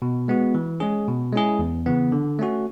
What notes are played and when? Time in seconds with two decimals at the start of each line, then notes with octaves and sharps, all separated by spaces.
0.02 B2
0.28 G#3 B3 F#4
0.55 E3
0.80 G#3 C#4 G#4
1.07 B2
1.33 G#3 C#4 E4 G#4
1.59 E2
1.86 C#3 E3 B3
2.12 D3
2.39 A3 C#4 F#4